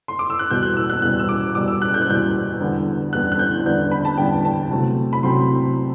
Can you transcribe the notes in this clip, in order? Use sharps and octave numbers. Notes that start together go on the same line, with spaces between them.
C6
D6
E6
F#6
E2 B2 G3 G6
F#6
E6
F#6
E2 B2 G3 F#6
E6
D6
E2 B2 G3 D6
E6
F#6
G6
F#6
E2 B2 G3 G6
E2 D3 G3 B3 D4
E2 D3 G3 B3 D4 F#6
F#6
G6
E2 D3 G3 B3 D4 G6
B5
A5
E2 D3 G3 B3 D4 G5
A5
C3 F#3 A3 C4
B5
C3 F#3 A3 C4 C6